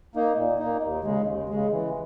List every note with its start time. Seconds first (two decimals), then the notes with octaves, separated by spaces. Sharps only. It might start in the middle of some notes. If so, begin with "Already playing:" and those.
0.15 A#3 D#4
0.37 A#2
0.59 A#3 D#4
0.83 D#2
1.04 C#3 G#3
1.27 D#2
1.49 C#3 G#3
1.72 E3